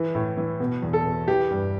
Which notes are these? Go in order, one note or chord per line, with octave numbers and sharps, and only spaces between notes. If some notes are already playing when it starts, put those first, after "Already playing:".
Already playing: E3
A2
E3
B2
E2
A4
B2
E3 G4
G2